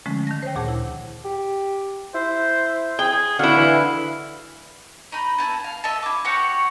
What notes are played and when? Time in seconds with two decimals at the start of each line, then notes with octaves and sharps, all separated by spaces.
0.06 D3 F3 G#3 A3 C#4
0.27 D#3 A5 A#6
0.42 C5 C#5 G5
0.55 D2 A#2 G#4 F#5 A5
0.68 E4
1.25 G4
2.15 E4 C5
2.99 G#4 G5
3.39 D3 E4 F#4 F5
3.57 E3
5.12 D#4 B5
5.38 B3 E4 A5
5.64 F5
5.84 A4 D#5 E5
6.03 E4 D6
6.25 F#4 G4 C#5 F#5